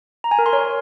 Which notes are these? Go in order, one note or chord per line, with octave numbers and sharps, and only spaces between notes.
A#5
G#5
A#4
C6
C#5